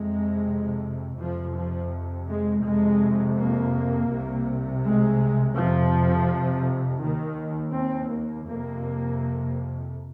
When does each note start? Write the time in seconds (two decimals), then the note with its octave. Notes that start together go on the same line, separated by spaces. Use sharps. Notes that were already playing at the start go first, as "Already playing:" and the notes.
Already playing: F2 C3 G#3
1.19 F2 C3 F3
1.55 F3
2.28 G#3
2.65 F2 C3 G#3
3.37 A#3
4.10 C2 C3
4.84 G#3
5.56 F2 C3 F3
7.02 D#2 D#3
7.75 C4
8.11 A#3
8.48 F2 C3 A#3